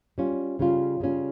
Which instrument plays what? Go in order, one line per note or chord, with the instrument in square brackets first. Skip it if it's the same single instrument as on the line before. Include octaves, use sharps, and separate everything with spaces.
[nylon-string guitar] G3 C#4 F4
C#3 G3 C#4 F4
C#3 G3 C#4 F4